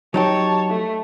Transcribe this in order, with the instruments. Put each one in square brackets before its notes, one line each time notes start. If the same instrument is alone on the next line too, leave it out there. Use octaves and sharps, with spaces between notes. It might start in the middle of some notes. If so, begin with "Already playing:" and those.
[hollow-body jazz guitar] F#3 D#4 G4 [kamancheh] C#5 A5
[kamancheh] A3